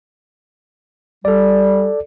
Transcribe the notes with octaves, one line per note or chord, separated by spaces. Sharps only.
G3 A4 D5